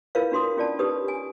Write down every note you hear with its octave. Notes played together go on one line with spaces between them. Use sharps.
E4 F4 A#4 B4 C#5 F5
D4 F#4 C6 D#6
C#4 F4 D5 A5
D#4 G4 B4 C#5 D#6
G#5